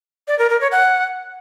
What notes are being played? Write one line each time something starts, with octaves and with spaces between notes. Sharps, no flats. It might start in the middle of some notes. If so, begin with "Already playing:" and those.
D5
A#4
A#4
C#5
F#5